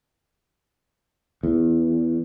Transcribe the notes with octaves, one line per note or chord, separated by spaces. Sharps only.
E2